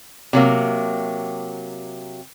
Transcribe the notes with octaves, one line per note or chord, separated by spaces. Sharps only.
C3 F#3 A#3